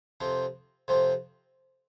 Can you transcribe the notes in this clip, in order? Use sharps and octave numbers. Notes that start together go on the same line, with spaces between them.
F2 C3 F3 C4
F2 C3 F3 C4